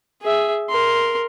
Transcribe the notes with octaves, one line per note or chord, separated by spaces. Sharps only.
G#4 E5
A#4 C6